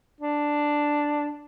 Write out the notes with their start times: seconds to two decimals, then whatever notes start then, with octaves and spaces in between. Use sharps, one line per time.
0.21 D4